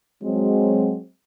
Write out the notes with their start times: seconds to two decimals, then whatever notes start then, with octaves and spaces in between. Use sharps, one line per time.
0.23 F#3 G#3 C4